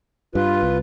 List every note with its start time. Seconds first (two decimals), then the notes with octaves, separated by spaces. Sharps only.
0.35 G2 F4 B4
0.63 C2